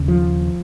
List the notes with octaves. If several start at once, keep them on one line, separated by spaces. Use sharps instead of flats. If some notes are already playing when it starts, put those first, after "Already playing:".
Already playing: D#2 C#3
F3